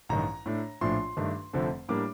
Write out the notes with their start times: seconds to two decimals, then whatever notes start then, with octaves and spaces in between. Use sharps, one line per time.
0.09 A1 G2 D#3 A#5
0.46 A2 A3 D4
0.81 A#1 A2 F3 A3 D4 C6
1.17 G2 D#3 A3 D4
1.53 F1 F2 D3 A3 C4
1.89 A2 G3 A#3 D4 D6